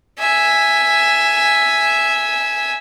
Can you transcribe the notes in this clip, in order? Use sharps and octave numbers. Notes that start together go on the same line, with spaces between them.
E5 G#5